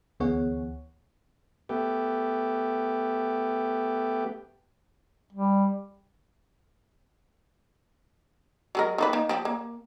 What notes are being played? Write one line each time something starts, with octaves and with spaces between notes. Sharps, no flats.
D2 E3 B3 G#4 C#5 F#5
A3 B3 G4
G3
F#3 G#3 A#4
D#3 A#3 B4
A#3 D#4
F3 G4
A#3